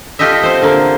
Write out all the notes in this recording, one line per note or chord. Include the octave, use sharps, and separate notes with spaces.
F4 G4 A4 D#5 E5
C4 C5
D3 A#3